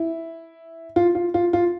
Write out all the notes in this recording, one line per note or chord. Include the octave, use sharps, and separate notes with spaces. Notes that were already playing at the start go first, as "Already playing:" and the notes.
Already playing: E4
F4
F4
F4
F4